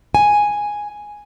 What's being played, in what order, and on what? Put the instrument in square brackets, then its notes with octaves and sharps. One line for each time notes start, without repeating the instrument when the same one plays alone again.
[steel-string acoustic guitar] G#5